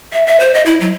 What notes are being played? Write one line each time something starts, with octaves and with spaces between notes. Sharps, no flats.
E5
E5
C5
D#5
E4
F#3